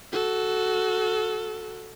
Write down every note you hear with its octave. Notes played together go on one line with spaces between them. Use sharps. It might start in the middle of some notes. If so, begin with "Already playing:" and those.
F#4 A4